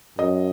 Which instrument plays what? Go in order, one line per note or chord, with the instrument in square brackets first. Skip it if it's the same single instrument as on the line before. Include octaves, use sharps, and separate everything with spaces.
[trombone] F#2 [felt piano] D#5